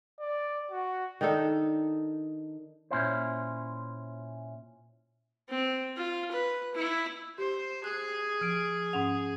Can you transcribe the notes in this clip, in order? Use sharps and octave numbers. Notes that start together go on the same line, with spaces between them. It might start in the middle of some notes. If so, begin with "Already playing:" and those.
D5
F#4
D#3 D4 D#4 A4
A#2 C#4 E4 C5
C4
F4
B4
E4
G4 C5
G#4 F#6
F3 F6 D7
G#2 C#4 F#5 D#6 F7